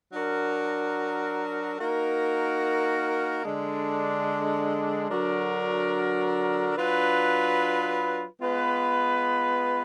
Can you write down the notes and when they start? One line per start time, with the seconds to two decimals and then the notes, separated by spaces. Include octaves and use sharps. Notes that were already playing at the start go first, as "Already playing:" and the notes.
0.13 F#3 D4 F#4 A#4
1.78 A#3 D#4 F#4 A#4
3.44 D3 G#3 D4
5.10 D3 F#3 D4 F#4 A#4
6.76 F#3 D4 F4 B4
8.40 G#3 B3 F4 B4